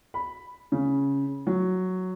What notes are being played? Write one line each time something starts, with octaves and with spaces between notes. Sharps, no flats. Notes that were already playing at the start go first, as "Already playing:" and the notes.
B5
C#3
F#3